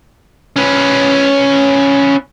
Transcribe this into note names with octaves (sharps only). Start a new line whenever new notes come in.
C#4 B4